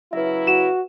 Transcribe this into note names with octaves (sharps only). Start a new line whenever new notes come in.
C#3 F#3 E4 B4 E5
F#4 E7